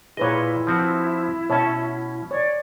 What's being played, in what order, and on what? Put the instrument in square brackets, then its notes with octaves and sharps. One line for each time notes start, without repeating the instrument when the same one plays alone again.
[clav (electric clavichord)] A#2 D#5 [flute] E4 [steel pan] G#4 B4 C#5
[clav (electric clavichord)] F3 C4 F#4
[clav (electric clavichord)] B2 C#4 [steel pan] C#5 E5 A5
[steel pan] C#5 [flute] D5